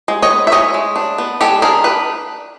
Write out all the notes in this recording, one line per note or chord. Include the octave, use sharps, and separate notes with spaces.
G#3
C#5 D#5
B3
E5
G#3 C#5 D#5
G#3
D4
B3
G#3 G4 A4
D4 G#4 A#4
D4 B4